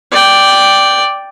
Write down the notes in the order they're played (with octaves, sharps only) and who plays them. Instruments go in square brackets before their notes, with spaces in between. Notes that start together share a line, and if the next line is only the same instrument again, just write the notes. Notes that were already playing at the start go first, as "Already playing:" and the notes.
[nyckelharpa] D5 G5